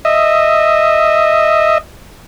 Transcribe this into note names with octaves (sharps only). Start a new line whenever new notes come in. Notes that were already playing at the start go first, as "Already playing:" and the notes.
D#5 E5